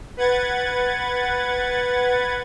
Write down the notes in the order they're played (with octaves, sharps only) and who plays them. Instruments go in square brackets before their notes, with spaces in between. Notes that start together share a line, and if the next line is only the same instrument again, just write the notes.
[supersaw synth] B4 F#5 G#6 A6